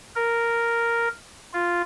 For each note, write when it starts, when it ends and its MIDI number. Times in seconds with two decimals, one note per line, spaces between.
0.16 1.08 70
1.54 1.82 65